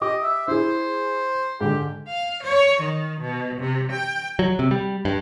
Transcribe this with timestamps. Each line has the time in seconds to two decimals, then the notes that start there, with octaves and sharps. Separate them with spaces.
0.01 G4 D#5 D6
0.23 E5
0.48 E4 G#4 C5
1.61 G#2 D3 G4
2.08 F5
2.43 C#5
2.81 D#3
3.21 B2
3.60 C3
3.92 G5
4.39 F#3
4.59 C3
4.71 G3
5.05 G2